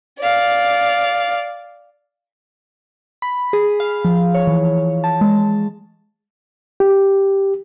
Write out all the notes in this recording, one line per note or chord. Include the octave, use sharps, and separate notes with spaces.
D5 F5
B5
G#4
F5
F3
C#5
E3
A5
G#3
G4